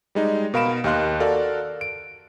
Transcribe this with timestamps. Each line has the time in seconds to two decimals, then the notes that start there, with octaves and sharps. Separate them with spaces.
0.15 G3 G#3 D#4
0.54 B2 A#4 F5 B5 D7 E7
0.84 D#2 G4 D#5 F5 C6 F#6
1.20 F#4 A4 A#4 D5 F5
1.81 D7